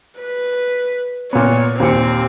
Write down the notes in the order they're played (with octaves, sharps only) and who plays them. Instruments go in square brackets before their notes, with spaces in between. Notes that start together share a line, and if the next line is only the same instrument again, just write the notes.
[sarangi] B4
[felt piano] A#2 B3 [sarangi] C#5
[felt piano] D#2 A#2 C#7 [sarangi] C4